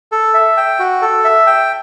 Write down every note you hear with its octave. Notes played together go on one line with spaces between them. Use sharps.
A4
E5
G5
F#4
A4
E5
G5